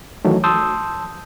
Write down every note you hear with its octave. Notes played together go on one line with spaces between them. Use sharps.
D#3 E3 F#3 A3
A5 C6 D#6 E6 G6